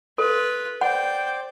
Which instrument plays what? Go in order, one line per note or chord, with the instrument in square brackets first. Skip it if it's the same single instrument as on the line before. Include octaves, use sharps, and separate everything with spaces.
[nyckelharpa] F4 B4 [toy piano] A4
[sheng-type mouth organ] C5 D5 [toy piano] F#5 [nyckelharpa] G5